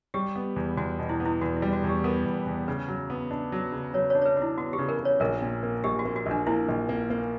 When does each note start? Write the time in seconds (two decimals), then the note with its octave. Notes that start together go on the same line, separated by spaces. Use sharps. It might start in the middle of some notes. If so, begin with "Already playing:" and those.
0.14 G3 G4
0.36 B3
0.56 E2
0.77 E2 F#4
0.99 B2
1.09 E4
1.20 B3
1.26 E4
1.41 E2 F#4
1.57 E4
1.62 G3
1.73 F#4
1.84 E2
1.89 G4
2.04 B3 A#4
2.25 E2
2.46 E2
2.68 C#3 B4
2.88 F#3
3.10 B3
3.31 D4
3.52 F#3
3.72 C#3
3.94 F#3 C#5
4.10 C#5
4.15 D4
4.22 C#5
4.26 B4
4.37 D4
4.42 E4
4.57 B3 F#4
4.73 G4
4.79 C#3
4.89 A#4
4.99 C#3
5.05 C#5
5.20 A#1 A#4
5.42 A#2
5.63 A#3
5.84 A#1 G4
5.99 F#4
6.05 A#3
6.16 F#4
6.26 A#1 D4
6.47 A#3 E4
6.69 A#1
6.89 A#3
7.10 A#3